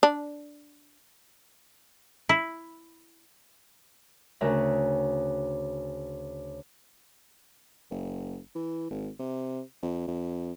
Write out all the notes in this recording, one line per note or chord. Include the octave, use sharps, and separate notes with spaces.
D4
E4
D2 C#3 F#4 A#4 E5
F#1
E3
G#1
C3
F2
F2